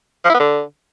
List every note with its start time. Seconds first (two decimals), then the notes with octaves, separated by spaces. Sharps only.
0.24 F3
0.29 E4
0.34 B3
0.39 D3